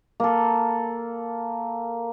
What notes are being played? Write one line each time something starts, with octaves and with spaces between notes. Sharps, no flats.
A#3 A4